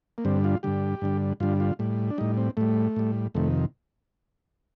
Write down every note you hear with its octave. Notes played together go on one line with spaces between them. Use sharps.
A#3
G2 D3 G3 C4
F4
G2 D3 G3 G4
G2 D3 G3
G2 D3 G3 F4
F4
A2 G3
D4
A2 G3 D#4
C4
A2 G3 A3
A2 G3
F2 C3 D#3 A3